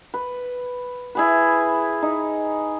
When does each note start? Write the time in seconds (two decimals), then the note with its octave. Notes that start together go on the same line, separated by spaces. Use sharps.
0.14 B4
1.15 E4 G#4 B4
2.03 D#4